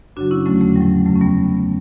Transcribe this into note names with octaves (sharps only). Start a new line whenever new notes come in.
F#2 C#3 F#3 D4 F#4
C#4 E4
E2 D3 F#3 A3 C#4
A3
A2 F#3 G3
F#2 C#3 F#3 A3
C#4
G3 B3